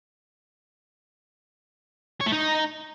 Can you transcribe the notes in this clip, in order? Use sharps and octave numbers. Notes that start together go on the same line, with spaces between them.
C#5
A3
D#4